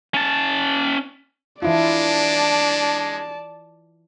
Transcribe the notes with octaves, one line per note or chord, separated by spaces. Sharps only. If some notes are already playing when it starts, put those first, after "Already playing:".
C#4 A5
E3 G#3 D4 E4 F4 D5 A5